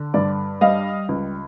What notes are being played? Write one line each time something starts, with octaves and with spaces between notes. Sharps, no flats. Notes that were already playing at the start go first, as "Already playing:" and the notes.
Already playing: D3
G2 D5
G3 D#5 F5
C#2